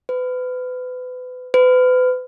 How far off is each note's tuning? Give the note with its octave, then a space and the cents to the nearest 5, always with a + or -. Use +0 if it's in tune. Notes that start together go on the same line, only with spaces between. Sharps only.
B4 +30
B4 +35